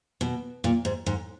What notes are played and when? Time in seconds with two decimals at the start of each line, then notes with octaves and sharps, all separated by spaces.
0.21 B2
0.64 A#2
0.85 G#2
1.06 G#2